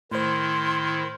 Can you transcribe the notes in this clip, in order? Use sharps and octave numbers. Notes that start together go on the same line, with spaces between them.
A2 D#3 E4 C5 C6